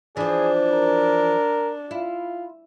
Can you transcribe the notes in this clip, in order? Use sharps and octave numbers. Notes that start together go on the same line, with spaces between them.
E3 F3 D4 G#4
A#4
E4 F4